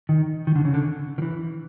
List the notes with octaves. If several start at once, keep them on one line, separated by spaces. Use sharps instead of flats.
D#3
D#3
D3
C#3
D3
D#3
E3